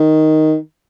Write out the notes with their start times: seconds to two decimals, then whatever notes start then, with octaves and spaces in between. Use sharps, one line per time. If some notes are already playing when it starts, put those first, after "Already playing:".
Already playing: D#3